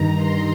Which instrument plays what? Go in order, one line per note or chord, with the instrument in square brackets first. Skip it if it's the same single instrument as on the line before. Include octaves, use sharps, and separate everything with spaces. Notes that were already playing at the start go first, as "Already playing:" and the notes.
Already playing: [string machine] G2 D#3 A#5
C6